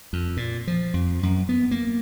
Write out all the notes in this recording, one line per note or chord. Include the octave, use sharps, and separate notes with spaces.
F2
A#2
F3
F2
F#2
B3
A#3